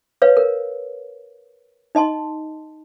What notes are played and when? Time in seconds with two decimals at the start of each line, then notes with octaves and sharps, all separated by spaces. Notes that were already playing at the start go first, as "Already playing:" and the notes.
0.22 B4 C#5 F5
0.37 A#4
1.95 D#4 D#5 A5 C6